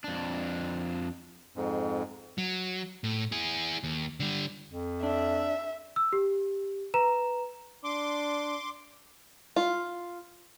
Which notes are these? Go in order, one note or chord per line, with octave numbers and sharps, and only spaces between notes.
F2 D4
F2 G#2
F#3
A2
E4 G#4
D#2
D3 G3
F2
D4 E5
E6
G4
B4 A#5 E7
D4 C6 D6
F4